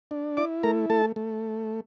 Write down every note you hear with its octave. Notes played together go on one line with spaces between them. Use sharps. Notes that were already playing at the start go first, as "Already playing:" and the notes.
D4
E4 D5 D6
A3 A#4 A#5
A3 A4 A5
A3